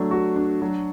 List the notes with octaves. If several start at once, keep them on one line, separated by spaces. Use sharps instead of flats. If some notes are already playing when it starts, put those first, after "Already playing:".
Already playing: F#3 A3 D4
F#4
D4
F#3